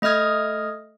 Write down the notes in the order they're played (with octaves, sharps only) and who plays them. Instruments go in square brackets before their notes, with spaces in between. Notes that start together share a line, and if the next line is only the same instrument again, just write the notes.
[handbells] A3 D#5 D#6 F6 G#6